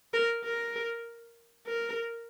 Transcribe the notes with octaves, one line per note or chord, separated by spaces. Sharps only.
A#4
A#4
A#4